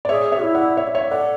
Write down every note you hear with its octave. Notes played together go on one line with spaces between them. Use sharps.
D5
G#4 C#5 E5
C#5 E5
E4
D5 F#5
C#5 E5
C#5 E5
A4 D5 F#5